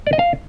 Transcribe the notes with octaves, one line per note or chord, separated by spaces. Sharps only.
D5
D#5
F5